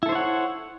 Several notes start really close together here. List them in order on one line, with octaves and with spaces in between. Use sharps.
E4 A4 C5 C#5 F#5